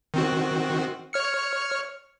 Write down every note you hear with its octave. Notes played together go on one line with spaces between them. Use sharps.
D#3 C4 F#4
C#5 F6 C#7